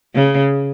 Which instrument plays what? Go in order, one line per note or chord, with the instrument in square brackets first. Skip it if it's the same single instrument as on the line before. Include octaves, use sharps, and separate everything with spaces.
[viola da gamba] C#3